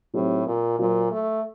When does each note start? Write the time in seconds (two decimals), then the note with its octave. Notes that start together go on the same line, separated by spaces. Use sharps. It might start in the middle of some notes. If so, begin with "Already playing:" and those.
0.14 A2 F#3 C4 D#4 G4 C5
0.47 A#2
0.79 A#2 F#3 A#3 F#4 C5
1.11 A3